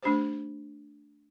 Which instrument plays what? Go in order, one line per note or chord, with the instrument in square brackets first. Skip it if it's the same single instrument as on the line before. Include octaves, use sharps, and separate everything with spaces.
[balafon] A3 D4 G4 C5